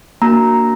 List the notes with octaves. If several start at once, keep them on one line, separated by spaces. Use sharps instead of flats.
A#3 D4 F#4 A#5